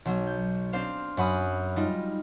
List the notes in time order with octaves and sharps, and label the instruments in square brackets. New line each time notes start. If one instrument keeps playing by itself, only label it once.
[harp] B1 F#3
G6
C4 D4 C5 F5
F#2 F#5 B5 D#6
G3 D#4 F4